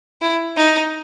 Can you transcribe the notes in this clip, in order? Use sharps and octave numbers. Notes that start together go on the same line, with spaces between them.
E4
D#4